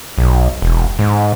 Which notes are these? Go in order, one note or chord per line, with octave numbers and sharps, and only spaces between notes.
B1
E1
G#2